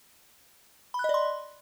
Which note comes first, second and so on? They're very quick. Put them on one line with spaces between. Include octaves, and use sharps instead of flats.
B5 F#6 D#5 D5 C6